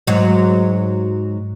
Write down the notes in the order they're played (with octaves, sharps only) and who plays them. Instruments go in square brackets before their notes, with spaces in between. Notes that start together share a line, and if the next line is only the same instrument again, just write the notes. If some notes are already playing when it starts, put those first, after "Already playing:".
[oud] G#2 F#3